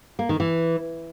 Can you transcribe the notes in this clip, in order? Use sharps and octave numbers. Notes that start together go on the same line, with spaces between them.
A#3
D#3
E3